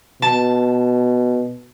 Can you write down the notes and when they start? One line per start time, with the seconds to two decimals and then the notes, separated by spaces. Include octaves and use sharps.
0.22 B2 A5